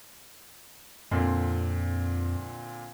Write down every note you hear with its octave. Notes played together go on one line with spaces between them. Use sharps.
F2 A#2 D3 C4